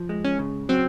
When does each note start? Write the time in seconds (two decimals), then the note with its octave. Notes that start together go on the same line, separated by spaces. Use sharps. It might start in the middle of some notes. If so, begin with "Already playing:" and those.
Already playing: F3
0.09 G#3
0.24 C#4
0.39 C#3
0.69 F#3 C4